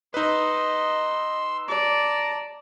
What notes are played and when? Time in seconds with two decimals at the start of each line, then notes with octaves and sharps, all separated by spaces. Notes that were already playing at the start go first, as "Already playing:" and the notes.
0.14 D#4 B4 D#5 C6 E6
1.68 D5 A5 A#5